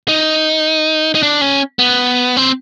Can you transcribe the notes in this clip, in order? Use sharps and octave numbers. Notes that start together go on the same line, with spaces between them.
D#4
D#4
D4
C#4
B3
C4